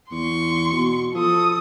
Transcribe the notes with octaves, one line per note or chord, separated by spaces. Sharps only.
E2 C6 C#6
B2
F3 A4 D#6